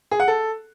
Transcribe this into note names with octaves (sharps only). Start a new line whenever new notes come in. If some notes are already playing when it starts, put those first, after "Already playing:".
G#4
F#5
A4